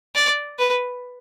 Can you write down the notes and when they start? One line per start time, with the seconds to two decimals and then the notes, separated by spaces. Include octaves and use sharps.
0.15 D5
0.59 B4